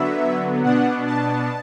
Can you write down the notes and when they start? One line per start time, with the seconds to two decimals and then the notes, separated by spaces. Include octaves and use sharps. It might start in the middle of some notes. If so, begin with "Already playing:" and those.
Already playing: D3 F#3 B3 E5
0.63 B2 B3 D4 F#5
1.06 A5